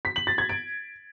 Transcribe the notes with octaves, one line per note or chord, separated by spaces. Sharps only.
B6
F#7
A6
G#6
D7